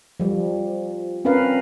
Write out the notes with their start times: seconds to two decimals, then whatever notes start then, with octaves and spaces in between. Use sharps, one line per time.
0.20 F3 G3
1.25 C4 C#4 A#4 B4 F5